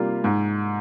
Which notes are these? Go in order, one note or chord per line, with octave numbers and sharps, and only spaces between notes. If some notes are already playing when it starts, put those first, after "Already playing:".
Already playing: C3 G3 A#3 F4
G#2